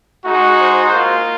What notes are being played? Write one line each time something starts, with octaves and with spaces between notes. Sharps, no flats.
G#3 D#4 F#4
C5
A#3 F4 C5